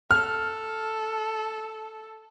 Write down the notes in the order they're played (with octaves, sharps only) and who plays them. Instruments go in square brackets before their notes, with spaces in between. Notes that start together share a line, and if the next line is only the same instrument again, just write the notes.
[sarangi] A4 [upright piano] F6